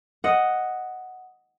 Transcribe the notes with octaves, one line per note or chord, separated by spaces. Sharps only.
D#5 F#5